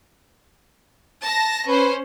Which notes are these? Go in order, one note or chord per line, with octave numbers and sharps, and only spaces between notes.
A5 A#6
C#4 B4 C5